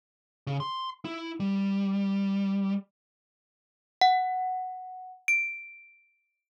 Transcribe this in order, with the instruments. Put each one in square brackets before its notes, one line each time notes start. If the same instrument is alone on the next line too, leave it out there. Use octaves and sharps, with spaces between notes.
[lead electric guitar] C#3
C6
E4
G3
[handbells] F#5
D7